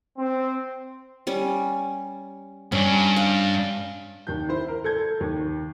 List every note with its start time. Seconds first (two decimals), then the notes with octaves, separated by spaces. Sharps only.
0.18 C4
1.27 G3 C#4
2.72 G2 C#4
3.16 F5
4.27 D#2 G6
4.49 E4 C5
4.68 A#4
4.84 A4 G6 G#6
5.20 D#2